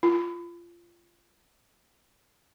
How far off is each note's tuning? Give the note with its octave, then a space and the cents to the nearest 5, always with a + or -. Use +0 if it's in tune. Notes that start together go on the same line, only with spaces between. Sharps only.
F4 -20